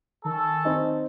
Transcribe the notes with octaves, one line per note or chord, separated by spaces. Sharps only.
D#3 C#4 A4 A5
C4 D#4 D#5